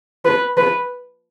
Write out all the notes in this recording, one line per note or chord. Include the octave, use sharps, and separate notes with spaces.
B4
B4